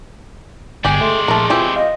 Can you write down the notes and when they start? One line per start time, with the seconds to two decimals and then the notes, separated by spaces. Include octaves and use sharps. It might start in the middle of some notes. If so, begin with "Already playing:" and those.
0.85 G1 G#3 G4 D5 G#5
1.01 A3 C6
1.28 A#1 A3 A#4
1.50 E3 F3 C4 G4
1.76 F4 D#5